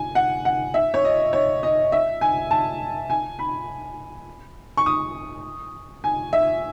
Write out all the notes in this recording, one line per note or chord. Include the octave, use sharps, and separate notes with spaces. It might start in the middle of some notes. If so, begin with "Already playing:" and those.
Already playing: G#5
F#5
F#5
E5
C#5
D#5
C#5
D#5
E5
G#5
A5
G#5
B5
C#6
D#6
G#5
E5